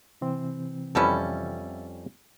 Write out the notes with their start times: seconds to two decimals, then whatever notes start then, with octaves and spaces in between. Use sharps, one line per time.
0.21 C3 E3 C4
0.95 F2 G3 B3 C#4 E4 A4